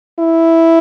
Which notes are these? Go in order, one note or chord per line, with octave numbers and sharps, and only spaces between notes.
E4